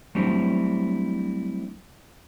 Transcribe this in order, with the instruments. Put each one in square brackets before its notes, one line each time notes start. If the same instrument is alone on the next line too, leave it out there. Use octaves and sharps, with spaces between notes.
[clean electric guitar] F#3 G3 A3 C4 D4 E4